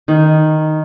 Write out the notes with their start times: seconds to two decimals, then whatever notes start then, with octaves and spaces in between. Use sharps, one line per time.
0.08 D#3